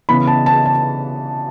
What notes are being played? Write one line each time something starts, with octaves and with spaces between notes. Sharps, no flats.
C#3 E3 B3 E4 B5
A5
A5
A5